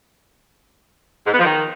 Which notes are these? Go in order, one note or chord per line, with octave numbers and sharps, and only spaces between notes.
G#2
B3
F3
D#3